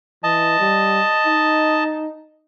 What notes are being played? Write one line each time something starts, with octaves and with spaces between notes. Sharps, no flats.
E3 D#5 A5
G3
D#4